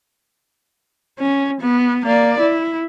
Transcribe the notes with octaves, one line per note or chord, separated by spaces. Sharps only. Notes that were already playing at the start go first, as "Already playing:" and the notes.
C#4
B3
A#3 D5
E4